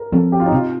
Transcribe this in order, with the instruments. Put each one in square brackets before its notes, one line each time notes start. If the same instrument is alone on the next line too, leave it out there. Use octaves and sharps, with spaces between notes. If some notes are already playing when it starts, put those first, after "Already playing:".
Already playing: [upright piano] A#4
[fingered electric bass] F3 C4 [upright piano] A4
[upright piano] G4
F4
D#4
[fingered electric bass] C3 [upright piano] F4